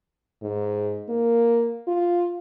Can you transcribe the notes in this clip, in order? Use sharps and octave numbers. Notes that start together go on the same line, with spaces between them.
G#2
A#3
F4